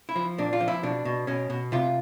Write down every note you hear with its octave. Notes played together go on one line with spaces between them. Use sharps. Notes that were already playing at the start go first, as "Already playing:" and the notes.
E4
F3
A#2 D4
F4
F3
E4
B2 D4
B2
B2 C#4
B2
C3 F4